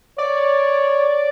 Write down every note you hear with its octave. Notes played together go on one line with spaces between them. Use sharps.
C#5 D5